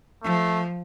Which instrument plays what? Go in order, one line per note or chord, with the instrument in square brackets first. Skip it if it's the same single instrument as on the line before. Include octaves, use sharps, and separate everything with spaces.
[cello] F3 [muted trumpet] A3